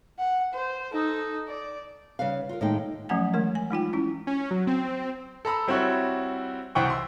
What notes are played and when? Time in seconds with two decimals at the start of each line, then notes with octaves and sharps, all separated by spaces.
0.19 F#5
0.54 C5
0.92 D#4 A4
1.48 D5
2.19 C#3 G3 B4 F5
2.49 F4 A#4
2.61 A2 D#3 G#3 A#3 D#4 G5
3.09 F3 F#3 A3 C#4 F#5 G#5
3.34 E3 G#3 A3 A#4
3.55 G#5
3.70 G#3 D#4 F4 G5
3.93 C#4 E4
4.27 C#4
4.51 F#3
4.67 C4
5.45 A4 A#5 B5 E6
5.68 G3 C4 E4 F#4 C#5
6.75 C2 E3 C5 F#5 G5 C#6
6.90 C6 E6